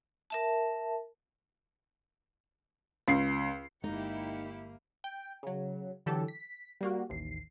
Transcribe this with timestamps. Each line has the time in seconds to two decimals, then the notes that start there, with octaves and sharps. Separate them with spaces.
0.30 A#4 E5 A5
3.08 C#2 C7
3.84 G1 G#3 A#3 D#4 E4 G4 C#7
5.04 G5
5.43 C#3 F#3
6.06 D3 E3 F#3 G4 A4
6.28 B6
6.81 G3 A#3 F#4
7.09 A1 D#2 C7